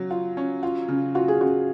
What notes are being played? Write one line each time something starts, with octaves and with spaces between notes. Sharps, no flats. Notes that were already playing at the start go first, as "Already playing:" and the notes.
Already playing: C#3 F#3 F#4
F4
C#4
F4
C#3
F4 F#4
G#4
C#3 F#4